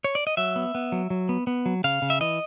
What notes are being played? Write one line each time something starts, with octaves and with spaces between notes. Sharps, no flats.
C#5
D5
D#5
F#3 E5
B3
B3
F#3
F#3
B3
B3
F#3
C#3 F5
C#3
E5
E3 D#5